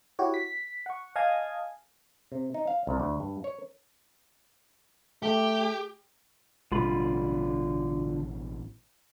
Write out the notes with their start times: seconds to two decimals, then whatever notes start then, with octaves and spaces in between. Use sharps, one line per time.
0.19 E4 F#4 G4 C#5
0.34 B6
0.86 F#5 C#6
1.16 D#5 F5 G#5 A5 D#6 G#6
2.32 C3
2.54 D#4
2.67 F5
2.87 C2
3.00 D2
3.20 G2
3.44 C#5
5.23 A3 G4
6.72 A1 B2 D3 G3 F4 B5